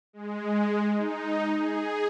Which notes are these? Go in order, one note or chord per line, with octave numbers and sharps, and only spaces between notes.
G#3
D#4
G#4